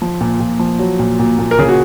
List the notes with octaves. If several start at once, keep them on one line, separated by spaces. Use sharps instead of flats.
F3
A#2
A#2
F3
F#3
A#2
A#2
A#2
A#4
C#3 G#4
F#4